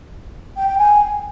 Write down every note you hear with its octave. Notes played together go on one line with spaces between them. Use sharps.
G5
G5
G#5